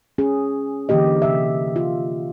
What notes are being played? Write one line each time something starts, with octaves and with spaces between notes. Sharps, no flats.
C#4 G#4
D3 E3 A#3 G4 D#5
C3 E5
F4